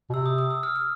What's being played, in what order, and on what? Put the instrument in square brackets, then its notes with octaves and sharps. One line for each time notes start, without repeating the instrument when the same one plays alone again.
[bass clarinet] B2
[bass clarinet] C3 [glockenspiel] E6
[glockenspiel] D#6
D#6
E6
F6
F6